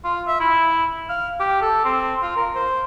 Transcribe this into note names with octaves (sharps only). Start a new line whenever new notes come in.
F4
E5
E4
F5
G4
A4
C4
F4
A#4
C5